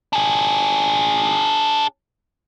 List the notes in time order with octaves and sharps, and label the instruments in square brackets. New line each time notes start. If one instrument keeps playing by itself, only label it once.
[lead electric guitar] D4 G#4